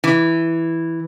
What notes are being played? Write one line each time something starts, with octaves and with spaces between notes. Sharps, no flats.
E3